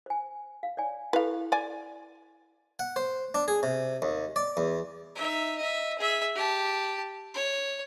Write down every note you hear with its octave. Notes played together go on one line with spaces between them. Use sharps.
C5 G#5
F5
C#5 D5 G#5
E4 G4 A4 B4 F5
D5 G#5
F#5
C5
D4
G#4
C3
D#2
D5
E2
D#4 E5
D#5 E5
G#4 E5
G4 A5
C#5